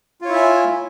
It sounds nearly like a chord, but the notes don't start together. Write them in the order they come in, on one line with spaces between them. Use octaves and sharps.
F4 C#5 E4 E5 G#5